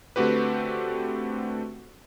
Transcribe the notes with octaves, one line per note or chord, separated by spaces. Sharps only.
D3 A3 C4 F#4 G4 B4